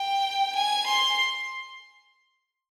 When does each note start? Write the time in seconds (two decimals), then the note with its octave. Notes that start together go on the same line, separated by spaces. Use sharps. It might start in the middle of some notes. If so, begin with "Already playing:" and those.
Already playing: G5
0.55 G#5
0.87 C6